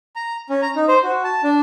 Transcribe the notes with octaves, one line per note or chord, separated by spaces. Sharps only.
A#5
C#4
A#5
D#4
C5
F#4
A5
D4